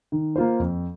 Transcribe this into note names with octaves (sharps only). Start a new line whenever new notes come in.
D#3
A#3 F4 C5
F2